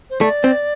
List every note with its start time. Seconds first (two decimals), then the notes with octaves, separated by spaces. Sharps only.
0.10 C5
0.21 A3 D5
0.44 C4